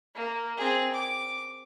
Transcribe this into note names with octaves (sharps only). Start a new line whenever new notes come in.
A#3
C4 G#4
D6